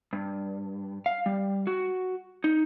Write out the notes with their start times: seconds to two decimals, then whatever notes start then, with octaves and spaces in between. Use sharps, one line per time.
0.13 G2
1.06 F5
1.26 G3
1.67 F#4
2.44 D#4